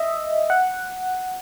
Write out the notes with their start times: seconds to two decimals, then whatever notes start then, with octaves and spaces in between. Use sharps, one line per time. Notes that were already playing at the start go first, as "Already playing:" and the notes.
Already playing: D#5 E5
0.50 F#5